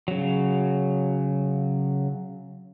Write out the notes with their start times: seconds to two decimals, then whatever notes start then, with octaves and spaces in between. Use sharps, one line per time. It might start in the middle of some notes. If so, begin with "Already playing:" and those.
0.08 C#3 F#3